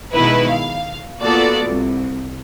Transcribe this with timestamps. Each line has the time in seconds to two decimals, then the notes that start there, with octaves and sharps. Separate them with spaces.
0.11 B2 D#3 G#3 E4 B4
0.49 F5
1.21 A#3 B3 F4 F#4 A4 D5
1.67 C2